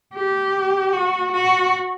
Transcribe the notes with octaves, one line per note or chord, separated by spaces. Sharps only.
G4
F#4
F#4